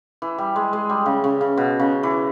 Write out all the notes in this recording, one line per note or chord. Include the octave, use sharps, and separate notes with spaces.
E3
G3
G#3
G#3
G3
C#3
C#3
C#3
B2
C#3
E3